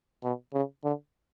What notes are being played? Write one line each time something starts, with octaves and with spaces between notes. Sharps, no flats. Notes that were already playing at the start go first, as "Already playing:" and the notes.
B2
C#3
D3